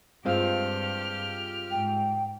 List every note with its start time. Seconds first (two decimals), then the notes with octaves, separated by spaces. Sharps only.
0.25 G2 G#3 C4 F4 G4 F6
1.71 G#2 G5